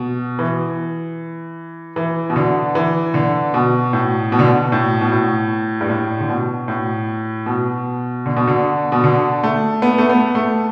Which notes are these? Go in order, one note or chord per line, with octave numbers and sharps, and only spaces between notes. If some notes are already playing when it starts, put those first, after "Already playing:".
Already playing: B2
E3
E3
B2
D3
E3
D3
B2
A2
B2
D3
B2
A2
B2
A2
G2
A2
D3
B2
A2
B2
D3
B2
D3
B2
D3
A3
B3
A3
B3
A3